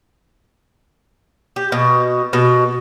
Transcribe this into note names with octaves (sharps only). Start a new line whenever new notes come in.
G4
B2
B2